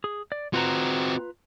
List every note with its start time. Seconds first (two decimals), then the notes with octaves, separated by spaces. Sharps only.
0.04 G#4
0.32 D5
0.54 C4 F4 F#4 B4 A#5